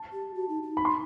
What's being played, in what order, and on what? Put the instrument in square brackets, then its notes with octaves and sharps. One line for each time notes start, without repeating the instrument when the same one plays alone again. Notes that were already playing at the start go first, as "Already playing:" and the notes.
Already playing: [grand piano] A5
[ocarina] G4
F#4
D#4
D#4
[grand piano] B5
C6